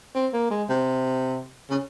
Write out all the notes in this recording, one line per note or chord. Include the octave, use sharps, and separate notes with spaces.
C4
A#3
G#3
C3
C#3